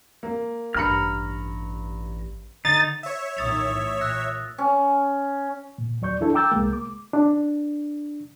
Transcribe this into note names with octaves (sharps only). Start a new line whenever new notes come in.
A#3
A1 G2 A#5 B5 F6 C#7
D3 D#4 A6
C#5 E5
B1 A#2 D#3 D#6 A6 F7
A2 E3
A#2 E6 F#6 A#6
C#4
A#2
D#2 F#3 D5 C#6 G6
D4 E4 A4
G5 A#5 D6 E6 G6 A6
C2 G#3 A#3
D6
D4